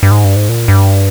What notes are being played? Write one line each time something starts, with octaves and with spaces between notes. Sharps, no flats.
G2
G#2
G2
G#2
A#2
G2